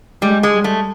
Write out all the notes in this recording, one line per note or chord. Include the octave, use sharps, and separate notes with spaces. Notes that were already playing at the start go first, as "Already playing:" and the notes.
G3 G#3
G#3
G3
A3